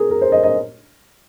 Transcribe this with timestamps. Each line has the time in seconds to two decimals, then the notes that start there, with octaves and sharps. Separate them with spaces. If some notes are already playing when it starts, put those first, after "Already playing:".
Already playing: G#4 A#4
0.10 A#4
0.21 C5
0.32 D#5
0.43 D#5